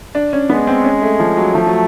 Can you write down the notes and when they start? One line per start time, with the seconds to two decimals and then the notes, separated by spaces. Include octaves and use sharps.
0.15 D4
0.33 C#4
0.49 G#3 B3
0.67 C4
0.85 C#4
1.02 A3
1.20 F3
1.37 F#3
1.55 F3 A3
1.66 F#3